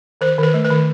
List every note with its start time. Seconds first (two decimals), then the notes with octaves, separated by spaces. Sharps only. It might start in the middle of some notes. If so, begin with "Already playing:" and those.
0.21 D#3 C5
0.38 D#3 B4
0.54 A3
0.65 B4
0.70 D#3